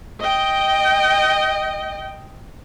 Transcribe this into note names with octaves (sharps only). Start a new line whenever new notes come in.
D#5 G5